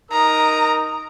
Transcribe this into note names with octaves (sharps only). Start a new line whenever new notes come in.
D#4 A#4 A#5 D#6